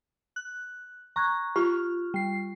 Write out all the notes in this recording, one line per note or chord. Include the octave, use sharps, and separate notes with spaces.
F#6
A#5 C#6 F#6 G#6
F4 G4 F6
G3 C7